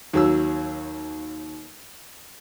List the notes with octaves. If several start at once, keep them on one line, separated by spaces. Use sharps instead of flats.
D#2 F#3 E6